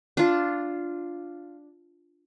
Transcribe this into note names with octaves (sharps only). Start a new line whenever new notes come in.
D4 F4